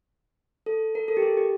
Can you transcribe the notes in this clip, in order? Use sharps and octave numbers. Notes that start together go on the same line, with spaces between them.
A4
A#4
A4
G4
G#4
G4